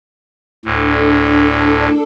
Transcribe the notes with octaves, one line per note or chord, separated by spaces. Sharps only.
D2 A2 D4 A4